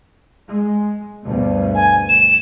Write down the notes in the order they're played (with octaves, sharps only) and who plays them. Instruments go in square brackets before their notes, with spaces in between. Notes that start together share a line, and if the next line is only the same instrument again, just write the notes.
[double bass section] G#3
D2 G2 B2
[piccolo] G#5
E7